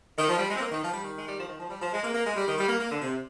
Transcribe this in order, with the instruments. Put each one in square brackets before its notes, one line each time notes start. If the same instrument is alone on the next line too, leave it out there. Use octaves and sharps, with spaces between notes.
[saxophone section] D#3
F3
G3
G#3
C4
A#3
D#3
F3
G3
D#3
G#3
G3
F3
D#3
F3
G3
F3
G#3
A#3
A#3
G#3
G3
D#3
G3
A#3
A#3
D3
C3